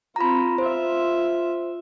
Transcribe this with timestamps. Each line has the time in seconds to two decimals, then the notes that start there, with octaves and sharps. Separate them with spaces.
0.16 C4 F4 A#5 B5
0.58 F4 C5 E5